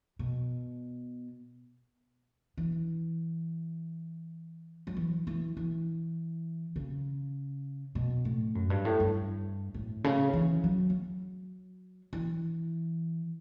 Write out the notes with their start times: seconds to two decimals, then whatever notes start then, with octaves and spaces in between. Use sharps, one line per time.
0.19 B2
2.57 E3
4.87 F#3
4.97 E3
5.27 E3
5.57 E3
6.76 C#3
7.95 B2
8.25 A2
8.55 F#2
8.70 G2
8.85 A2
9.00 G2
9.74 A2
10.04 C#3
10.33 E3
10.64 F#3
10.90 F#3
12.13 E3